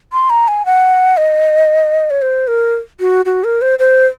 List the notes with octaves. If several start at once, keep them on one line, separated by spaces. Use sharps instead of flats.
C6
A#5
G#5
F#5
D#5
C#5
C5
A#4
F#4
F#4
A#4
C5
C5